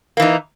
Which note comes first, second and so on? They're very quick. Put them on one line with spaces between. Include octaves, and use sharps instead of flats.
A#3 E3 D#4